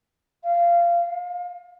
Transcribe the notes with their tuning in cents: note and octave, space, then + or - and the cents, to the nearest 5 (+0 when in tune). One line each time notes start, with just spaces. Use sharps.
F5 -20
F5 +30